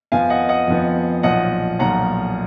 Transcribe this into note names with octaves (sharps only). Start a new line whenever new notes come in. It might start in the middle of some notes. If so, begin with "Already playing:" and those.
F2 F3 B3 F5 G#5
D#5 F#5
D#5 F#5
F2 F3 B3
B1 A#2 F3 D#5 F#5
B1 A#2 F3 F#5 A#5